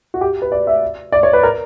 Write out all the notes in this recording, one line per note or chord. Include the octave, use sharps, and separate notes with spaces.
F#4
G4
B4
D5
E5
D5
C#5
B4
A#4